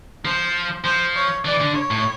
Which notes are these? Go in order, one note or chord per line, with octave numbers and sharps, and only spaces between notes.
F3 C5
F3 C5
C#5
E3 D5
D3
C#5
A2